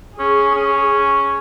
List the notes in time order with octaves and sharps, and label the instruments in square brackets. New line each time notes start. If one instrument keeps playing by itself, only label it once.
[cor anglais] C#4 [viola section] G#4
[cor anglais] C#4